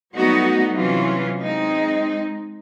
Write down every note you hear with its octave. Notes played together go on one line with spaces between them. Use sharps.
F#3 G3 A3 B3 D#4 F#4
C3 E3 F#3 C#4 F4
G#3 C4 D#4